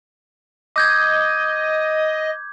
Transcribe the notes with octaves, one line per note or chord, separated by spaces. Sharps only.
D#5 D6 G6 G#6